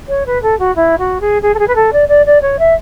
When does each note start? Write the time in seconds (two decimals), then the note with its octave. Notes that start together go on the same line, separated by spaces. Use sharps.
0.08 C#5
0.26 B4
0.42 A4
0.59 F#4
0.75 E4
0.98 F#4
1.20 G#4
1.42 G#4
1.54 A4
1.59 G#4
1.67 B4
1.75 A4
1.92 D5
2.08 D5
2.26 D5
2.41 C#5
2.59 E5